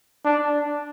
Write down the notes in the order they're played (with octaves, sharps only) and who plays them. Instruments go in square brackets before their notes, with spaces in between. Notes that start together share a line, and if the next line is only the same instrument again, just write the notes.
[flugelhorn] D4